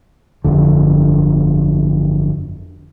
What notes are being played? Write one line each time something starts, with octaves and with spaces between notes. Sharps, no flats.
G1 F2 D3